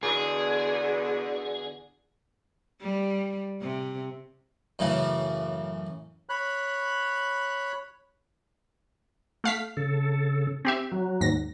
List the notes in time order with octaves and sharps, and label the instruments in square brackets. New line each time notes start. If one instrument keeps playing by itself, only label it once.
[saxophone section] E2 B2 D3 [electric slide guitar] G#4
[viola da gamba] G3
C3
[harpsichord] F#2 A2 C#3 E3
[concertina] C#5 B5 F#6
[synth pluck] A3 F5 B6
[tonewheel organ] C#3 A4
[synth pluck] C4 G4 E5
[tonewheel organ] F#3
[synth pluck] D#2 G#2 A#6